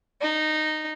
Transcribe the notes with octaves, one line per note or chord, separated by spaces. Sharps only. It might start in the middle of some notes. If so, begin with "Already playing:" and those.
D#4